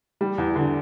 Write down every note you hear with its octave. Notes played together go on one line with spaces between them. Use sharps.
G3
E2
D3